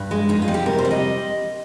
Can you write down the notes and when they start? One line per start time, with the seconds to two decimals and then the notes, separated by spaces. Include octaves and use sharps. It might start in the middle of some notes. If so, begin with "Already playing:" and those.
Already playing: G2
0.11 G#3
0.29 F2 D#4
0.42 F4
0.48 G3
0.54 G4
0.66 C3 A#4
0.79 C5
0.85 G3
0.91 D#5